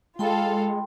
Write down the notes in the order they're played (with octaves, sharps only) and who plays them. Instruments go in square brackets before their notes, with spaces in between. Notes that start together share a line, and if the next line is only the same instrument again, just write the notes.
[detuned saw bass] G#3 [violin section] F4 A4 F5 [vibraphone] G5 B5 C6